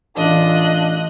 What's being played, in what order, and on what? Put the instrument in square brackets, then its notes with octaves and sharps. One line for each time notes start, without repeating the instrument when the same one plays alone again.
[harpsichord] A1 [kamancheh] D4 F4 [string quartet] D#5 F#6